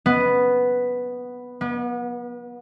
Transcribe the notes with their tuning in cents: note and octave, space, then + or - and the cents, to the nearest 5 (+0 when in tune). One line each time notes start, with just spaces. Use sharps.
B3 +0
B3 -35